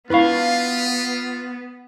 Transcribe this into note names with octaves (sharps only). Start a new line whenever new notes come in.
B3 E4 F4 B4 F5 B5 C#6